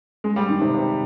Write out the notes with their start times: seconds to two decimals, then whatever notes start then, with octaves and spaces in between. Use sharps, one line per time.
0.24 G#3
0.36 G3
0.49 D#3
0.61 C3
0.74 C3